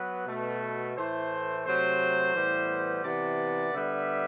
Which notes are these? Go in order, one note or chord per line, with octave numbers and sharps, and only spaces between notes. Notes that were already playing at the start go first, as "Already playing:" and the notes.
Already playing: F#3 B3 B4
B2 A3
A2 E3 A3 C5
C3 F#3 A3 C5
A2 E3 G3 B3
C3 E3 B3 D5
D3 G3 B3 E5